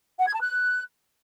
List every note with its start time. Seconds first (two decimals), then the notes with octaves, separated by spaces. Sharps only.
0.20 F#5
0.27 G#6
0.34 A5
0.41 F#6